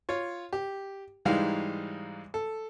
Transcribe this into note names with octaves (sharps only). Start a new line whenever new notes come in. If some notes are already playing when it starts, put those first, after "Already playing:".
F4 C#5
G4
G#2 E3 G3 G#3 D#4 F5
A4